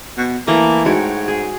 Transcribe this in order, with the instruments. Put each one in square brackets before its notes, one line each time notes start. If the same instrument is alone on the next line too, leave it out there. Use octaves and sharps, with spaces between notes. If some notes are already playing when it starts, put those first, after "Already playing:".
[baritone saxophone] B2
[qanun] E3 A3 A#5 [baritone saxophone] A#3
[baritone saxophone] G#2 [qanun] F#4 C#5 G5
[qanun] G#4